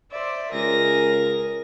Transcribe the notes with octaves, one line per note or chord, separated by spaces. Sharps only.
C5 D5 E5
C#2 G#4 A#4 A#6